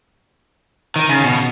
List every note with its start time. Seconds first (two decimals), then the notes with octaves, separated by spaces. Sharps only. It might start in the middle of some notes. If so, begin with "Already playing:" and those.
0.96 D#3
1.09 C#3
1.24 B2